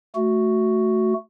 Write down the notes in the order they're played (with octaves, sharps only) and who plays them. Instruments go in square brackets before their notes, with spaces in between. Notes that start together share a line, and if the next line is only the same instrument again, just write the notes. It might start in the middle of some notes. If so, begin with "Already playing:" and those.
[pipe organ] A3 F#4